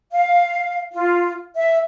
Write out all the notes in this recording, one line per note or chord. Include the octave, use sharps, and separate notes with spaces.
F5
F4
E5